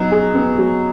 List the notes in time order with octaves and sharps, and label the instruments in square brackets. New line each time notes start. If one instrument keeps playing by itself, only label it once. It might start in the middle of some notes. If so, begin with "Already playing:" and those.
Already playing: [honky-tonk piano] F#3 [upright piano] B3 D#4
[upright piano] G#4
B3
F#3